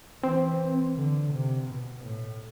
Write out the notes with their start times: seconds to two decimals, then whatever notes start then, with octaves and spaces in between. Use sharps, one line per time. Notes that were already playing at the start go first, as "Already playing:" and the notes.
0.23 E3 C4
0.96 D3
1.33 C3
1.69 B2
2.04 A2